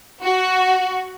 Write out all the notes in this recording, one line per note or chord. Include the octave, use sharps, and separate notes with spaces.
F#4